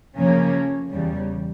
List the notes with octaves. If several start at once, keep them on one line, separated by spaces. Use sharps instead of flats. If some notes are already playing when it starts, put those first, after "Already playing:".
F2 C#3 F3 A#3 C#4
E2 C#3 G3